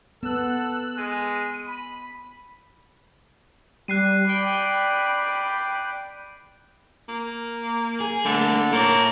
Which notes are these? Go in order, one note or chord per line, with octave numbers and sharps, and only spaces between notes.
B3 A4 E6 F#6
G#3 D#7
B5
G3 F#6 C7 D#7
D5 G5 B5 D7
A#3
G#4
D3 A3 A#3
A#3 A4 C#5